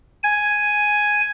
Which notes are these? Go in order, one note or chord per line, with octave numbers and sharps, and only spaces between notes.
G#5